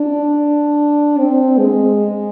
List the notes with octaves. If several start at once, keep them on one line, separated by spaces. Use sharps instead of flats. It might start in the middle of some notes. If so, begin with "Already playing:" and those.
Already playing: D4
C4
G#3